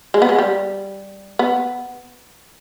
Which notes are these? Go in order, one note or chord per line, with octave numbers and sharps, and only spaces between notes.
G#3
B3
G#3
G3
B3